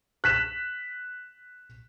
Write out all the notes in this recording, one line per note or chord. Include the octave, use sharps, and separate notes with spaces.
F#6 B6 E7